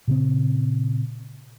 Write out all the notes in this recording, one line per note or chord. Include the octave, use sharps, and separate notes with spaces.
A#2 C#3 C4